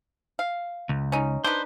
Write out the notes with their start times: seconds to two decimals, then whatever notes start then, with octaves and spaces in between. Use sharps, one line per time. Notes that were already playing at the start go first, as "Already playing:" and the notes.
0.39 F5
0.89 C#2
1.12 C#4 D#4
1.44 D4 D#4 B4 C5